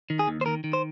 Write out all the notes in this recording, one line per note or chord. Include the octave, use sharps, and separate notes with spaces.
D#3
G#4
D#2
C5
D#3 A#4
D#3
C5